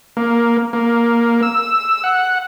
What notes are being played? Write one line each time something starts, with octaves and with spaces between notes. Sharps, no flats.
A#3
A#3
E6
F#5